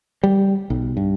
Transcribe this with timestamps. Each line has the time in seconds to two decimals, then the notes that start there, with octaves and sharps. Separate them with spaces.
0.23 G3
0.70 B1
0.97 G2